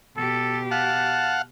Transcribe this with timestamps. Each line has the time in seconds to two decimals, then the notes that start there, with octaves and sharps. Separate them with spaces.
0.17 B2 G4 A4
0.71 F5 F#5 A5